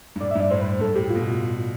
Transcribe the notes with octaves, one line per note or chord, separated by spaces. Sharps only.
G2
A2 D5
E5
G2
D5
A2 C5
B4
C5
G2 A4
A2 G4
G4
F4
B2